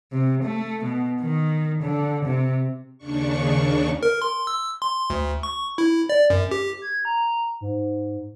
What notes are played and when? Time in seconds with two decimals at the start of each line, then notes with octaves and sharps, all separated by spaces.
0.12 C3
0.43 A3
0.84 B2
1.21 D#3
1.83 D3
2.25 C3
2.98 D#2 C#3 D4 C#6
4.03 A#4
4.22 C6
4.47 E6
4.82 C6
5.10 D2
5.43 C#6
5.78 E4
6.09 D5
6.30 F#2
6.51 G4
6.82 G#6
7.05 A#5
7.61 G#2